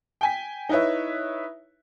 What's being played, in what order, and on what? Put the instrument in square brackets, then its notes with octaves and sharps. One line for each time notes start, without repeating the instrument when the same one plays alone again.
[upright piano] G5 G#5 B6
D#4 E4 B4 C#5 E5